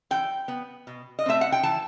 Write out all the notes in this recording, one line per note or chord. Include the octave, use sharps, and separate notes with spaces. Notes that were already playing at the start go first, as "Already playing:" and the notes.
E3 G5
B3
B2
D#5
A3 C4 E5
F#5
G5
E3 A5